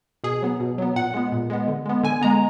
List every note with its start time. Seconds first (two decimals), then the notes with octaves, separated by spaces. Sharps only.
0.24 B2 G#4
0.42 F#3 B3
0.60 B2
0.78 F#3 B3
0.96 A#2 F#5
1.14 G#3 B3
1.32 A#2
1.50 G#3 B3
1.68 D3
1.86 G#3 B3
2.03 D3 G#5
2.21 G#3 B3 A#5